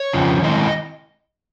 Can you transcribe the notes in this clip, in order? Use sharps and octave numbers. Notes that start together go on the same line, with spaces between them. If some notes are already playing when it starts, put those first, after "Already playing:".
Already playing: C#5
F2 C#3 F3
D#3 G#3 C4 E4 D#5